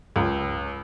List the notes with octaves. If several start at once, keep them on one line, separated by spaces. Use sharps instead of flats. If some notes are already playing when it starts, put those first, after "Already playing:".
C#2